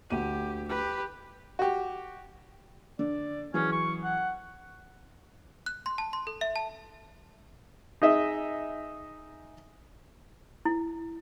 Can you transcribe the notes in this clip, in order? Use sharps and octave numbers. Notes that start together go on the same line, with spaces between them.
D2 G4 D#7
G4 B4
F#4 G4
D3 D5
E3 F#3 C#4 G#4
C#6
F#5
F#6
C6
A5
C6
A4
E5
A5
D#4 G#4 D#5 E5
E4